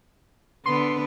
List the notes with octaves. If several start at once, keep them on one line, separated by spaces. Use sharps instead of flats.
D3 B3 B4 C6